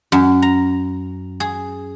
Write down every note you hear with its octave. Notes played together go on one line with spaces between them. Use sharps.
F#2
A#5
G#4